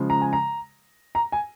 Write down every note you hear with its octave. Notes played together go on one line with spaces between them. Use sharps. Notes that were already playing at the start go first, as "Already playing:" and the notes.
Already playing: C#3 F3 G#3
A#5
G#5
A#5
A#5
G#5